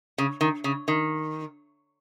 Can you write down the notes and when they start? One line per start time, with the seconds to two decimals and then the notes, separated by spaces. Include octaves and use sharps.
0.18 C#3
0.41 D#3
0.64 C#3
0.88 D#3